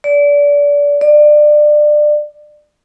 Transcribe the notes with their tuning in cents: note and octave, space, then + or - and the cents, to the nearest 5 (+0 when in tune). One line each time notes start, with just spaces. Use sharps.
D5 -25
D5 +25